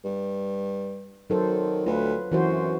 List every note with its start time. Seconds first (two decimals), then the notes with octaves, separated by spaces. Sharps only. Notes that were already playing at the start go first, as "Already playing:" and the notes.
0.05 G2
1.30 D#3 F#3 A4 C5
1.86 D2 F4 B4
2.32 F#2 E3 F#4 C5